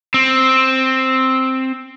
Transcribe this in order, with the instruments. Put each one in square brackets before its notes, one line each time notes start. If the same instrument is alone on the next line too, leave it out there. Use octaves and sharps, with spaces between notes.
[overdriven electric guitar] C4